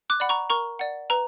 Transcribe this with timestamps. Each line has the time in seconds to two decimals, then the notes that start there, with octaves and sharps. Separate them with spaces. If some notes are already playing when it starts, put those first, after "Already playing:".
0.10 D6 F#6
0.20 D5 F#5 B5
0.29 A#5 C#6
0.50 A#4 A#5 C#6
0.79 D5 F#5
1.10 B4 A#5